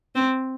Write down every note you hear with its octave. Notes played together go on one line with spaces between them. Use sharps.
C4